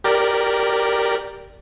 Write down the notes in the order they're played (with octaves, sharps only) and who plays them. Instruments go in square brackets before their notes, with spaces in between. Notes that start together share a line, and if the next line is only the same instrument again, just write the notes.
[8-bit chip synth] G4 A#4 D5